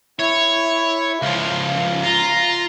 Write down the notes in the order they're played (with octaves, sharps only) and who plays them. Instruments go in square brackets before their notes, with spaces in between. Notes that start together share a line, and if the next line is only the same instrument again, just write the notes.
[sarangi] E4 [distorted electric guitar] C#5
[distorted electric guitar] C#2 F3 [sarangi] F5
[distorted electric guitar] F4 [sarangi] A#5